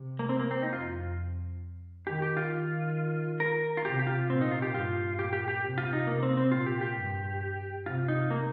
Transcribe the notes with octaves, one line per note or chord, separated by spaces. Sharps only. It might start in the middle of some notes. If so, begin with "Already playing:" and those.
Already playing: C3
A#3
C4
A#3
C4
D#4
F2 F4
D#3 G4
G4
F4
D#3
A#4
F4
C3 G4
G4
F4
A#2 C4
D#4
F4
G4
G2 F4
A#2 G4
G4
G4
C3
F4
D#4
C3 A#3
C4
C4
A#2 F4
G4
G4
G2
C3 F4
D#4
A#3